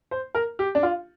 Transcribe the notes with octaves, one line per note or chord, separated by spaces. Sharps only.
C5
A#4
G4
D4
F4